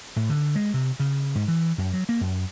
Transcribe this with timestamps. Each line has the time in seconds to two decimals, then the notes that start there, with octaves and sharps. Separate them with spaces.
0.16 A2
0.30 D3
0.55 G#3
0.74 C3
1.00 C#3
1.35 G#2
1.48 E3
1.78 F#2
1.93 F#3
2.09 A#3
2.21 F#2